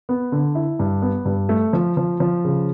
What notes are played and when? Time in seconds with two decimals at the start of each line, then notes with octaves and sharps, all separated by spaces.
0.09 B3
0.32 D3
0.55 E4
0.79 G2
1.02 B3
1.25 G2
1.49 A3
1.73 F3
1.97 F3
2.20 F3
2.44 C#3